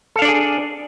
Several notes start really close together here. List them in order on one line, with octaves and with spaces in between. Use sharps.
A4 F5 D4 D5 G#4